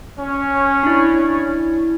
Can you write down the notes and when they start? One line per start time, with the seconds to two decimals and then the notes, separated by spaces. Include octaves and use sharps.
0.20 C#4
0.83 D4 E4